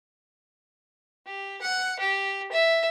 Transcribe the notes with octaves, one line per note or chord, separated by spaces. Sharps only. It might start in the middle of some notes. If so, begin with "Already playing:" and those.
G4
F#5
G4
E5